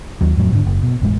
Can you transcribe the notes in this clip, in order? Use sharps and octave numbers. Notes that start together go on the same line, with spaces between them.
D#2 F#3
F2 A2 F#3
E1 G#2 D3
F#1
B2
E1 A1 G#3